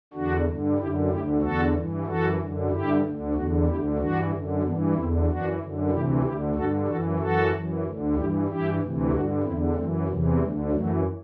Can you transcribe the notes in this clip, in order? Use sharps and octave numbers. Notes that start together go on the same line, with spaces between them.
E2 D3 D4 F#4
G2 D3
F#2 D3 E4 G4
D2 D3 E4 G4
E2 D3 F#4 A4
G2 E3
F#2 E3 F#4 A4
F#2 D3
G2 D3 E4 G4
D2 D3
E2 D3 D4 F#4
D2 D3 E4 G4
G2 E3 D4 F#4
F#2 D3
G2 E3 B3 D4
E2 D3 C4 E4
F#2 E3 D4 F#4
F#2 D3
D2 C3 E3 E4 G4
D2 D3 E4 G4
G2 D3 F#4 A4
F#2 E3 F#4 A4
F#2 E3 F#4 A4
F#2 E3
D2 D3
G2 E3 E4 G4
G2 E3 E4 G4
D2 C3 E3
G2 D3 D4 F#4
E2 D3 C4 E4
F#2 E3 A3 C4
E2 C3 E3 F#3
D2 D3 G3
F#2 E3 F#3 A3